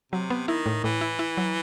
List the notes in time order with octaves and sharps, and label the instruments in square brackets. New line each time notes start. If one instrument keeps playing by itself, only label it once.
[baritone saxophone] C3 [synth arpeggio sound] F#3
[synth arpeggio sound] B3
[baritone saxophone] D#3 [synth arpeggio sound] E4
[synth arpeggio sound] A2
[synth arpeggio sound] A2 [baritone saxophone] E3
[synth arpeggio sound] E4
E4
F#3